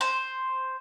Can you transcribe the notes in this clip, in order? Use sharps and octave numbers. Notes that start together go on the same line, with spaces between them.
C5